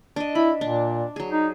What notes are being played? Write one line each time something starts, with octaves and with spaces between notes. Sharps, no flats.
D4 D#5
E4 B5
A#2 D4
F#3 G#4
D#4